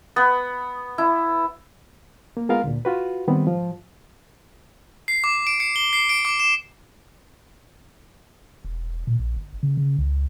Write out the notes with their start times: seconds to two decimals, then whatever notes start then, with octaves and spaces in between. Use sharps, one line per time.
0.16 B3
0.98 E4
2.37 A#3
2.49 G#3 B3 F4 A#4 F5
2.64 D2 A#2
2.85 F4 F#4 B4
3.28 D#3 G3 B3 C4
3.46 G#2 F3
5.08 C7
5.24 D6
5.47 D7
5.60 C#7
5.76 G7
5.93 C7
6.09 D7
6.25 D6
6.40 E7
8.64 E1
9.07 A#2
9.19 A#1
9.36 G1
9.63 C#3
9.77 C#3
9.99 C#2